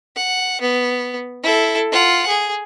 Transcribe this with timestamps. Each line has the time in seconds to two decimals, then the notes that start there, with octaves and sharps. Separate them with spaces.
0.16 F#5
0.61 B3
1.43 E4 A4
1.92 F4 F#5
2.28 G#4